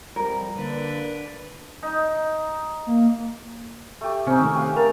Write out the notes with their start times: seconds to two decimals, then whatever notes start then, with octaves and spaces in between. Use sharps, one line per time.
0.16 F2 F3 G3 A#4
0.57 D3 A#3 D4 B4
1.83 D#4
2.86 A#3
4.01 A3 G4
4.27 C3 C4 C#4 D#4
4.40 D#3 A3
4.55 G4 B4 F5
4.77 A#4 A5